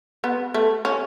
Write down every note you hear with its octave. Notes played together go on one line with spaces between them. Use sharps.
B3
A3
C#4